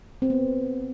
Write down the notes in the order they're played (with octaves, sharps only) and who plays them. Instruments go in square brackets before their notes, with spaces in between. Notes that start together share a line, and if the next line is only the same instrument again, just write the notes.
[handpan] C4
B3